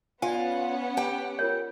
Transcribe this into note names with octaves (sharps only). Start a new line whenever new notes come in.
B3 C#4 F4 D5 F5 F#5 G#5
G4 G5
F4 A#4 C#5